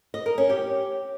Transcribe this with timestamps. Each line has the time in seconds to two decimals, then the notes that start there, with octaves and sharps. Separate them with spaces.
0.14 D#5
0.26 A#4
0.38 C#4
0.50 G4